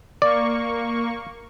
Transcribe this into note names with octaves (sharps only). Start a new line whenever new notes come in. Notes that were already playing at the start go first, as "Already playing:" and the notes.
A#3 D5 C#6